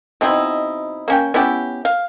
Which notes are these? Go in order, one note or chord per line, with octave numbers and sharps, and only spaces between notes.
B2 C4 D#4 E4
A#3 C#4 G5
B3 C#4 E4 G4
F5